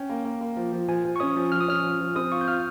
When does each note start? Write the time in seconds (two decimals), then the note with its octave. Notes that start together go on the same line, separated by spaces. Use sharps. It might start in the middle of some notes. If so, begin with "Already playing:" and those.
Already playing: C#4 G5
0.09 A#3
0.25 A#3
0.41 A#3
0.56 F3
0.72 F3
0.88 F3 G#5
1.05 F3
1.16 C#6
1.20 C#4 D#6
1.36 F3
1.52 F3 F6
1.61 D#6
1.68 C#4 F6
1.84 F3
2.00 F3
2.15 C4 D#6
2.32 F4 C#6
2.41 G6
2.48 F4 F6